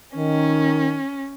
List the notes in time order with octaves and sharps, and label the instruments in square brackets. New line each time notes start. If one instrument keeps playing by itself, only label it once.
[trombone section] D#3 [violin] C#4